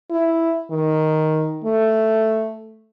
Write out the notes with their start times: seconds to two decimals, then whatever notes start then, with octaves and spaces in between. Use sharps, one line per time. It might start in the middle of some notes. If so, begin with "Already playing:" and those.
0.11 E4
0.71 D#3
1.65 A3